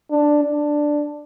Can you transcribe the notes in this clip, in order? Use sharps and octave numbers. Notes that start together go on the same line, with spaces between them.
D4
D4